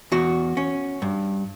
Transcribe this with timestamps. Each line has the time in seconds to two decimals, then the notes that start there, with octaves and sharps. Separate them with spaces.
0.12 E2 F#4
0.57 C#4
1.02 G2